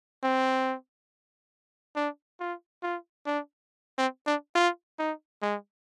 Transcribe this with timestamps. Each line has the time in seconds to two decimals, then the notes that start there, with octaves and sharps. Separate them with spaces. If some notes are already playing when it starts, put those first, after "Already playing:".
0.23 C4
1.96 D4
2.40 F4
2.83 F4
3.26 D4
3.98 C4
4.27 D4
4.55 F4
4.99 D#4
5.42 G#3